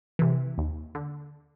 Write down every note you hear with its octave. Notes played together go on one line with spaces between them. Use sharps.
C3 E3
D#2
D3